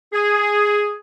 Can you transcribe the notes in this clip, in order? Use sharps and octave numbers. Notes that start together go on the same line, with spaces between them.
G#4